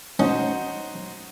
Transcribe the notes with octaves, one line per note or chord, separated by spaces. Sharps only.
C#4 D#4 F#4 C5